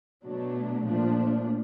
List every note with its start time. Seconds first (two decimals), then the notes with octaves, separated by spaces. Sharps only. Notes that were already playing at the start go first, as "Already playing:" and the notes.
0.24 B2 F#3 A3 D4
0.85 A#2 F3 A3 D4